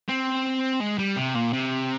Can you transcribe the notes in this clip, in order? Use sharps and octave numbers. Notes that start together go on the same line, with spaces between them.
C4
G#3
G3
C3
A#2
C3